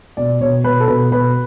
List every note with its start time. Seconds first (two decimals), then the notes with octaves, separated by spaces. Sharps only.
0.17 B2 D5
0.41 B2 C#5
0.64 B2 B4
0.80 A4
0.88 B2 B4
1.12 B2 B4